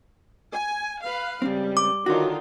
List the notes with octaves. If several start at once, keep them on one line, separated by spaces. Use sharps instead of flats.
G#5
B4 F5
C#2 G3 C4
D6
D3 D#3 F4 F#4 C#5